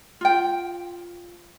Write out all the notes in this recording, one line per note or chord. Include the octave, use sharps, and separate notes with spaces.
F4 G5